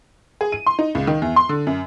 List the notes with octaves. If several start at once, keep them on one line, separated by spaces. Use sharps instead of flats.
G#4
D#7
C6
D#4
C#2
D#3
E2
C6
D3
F#2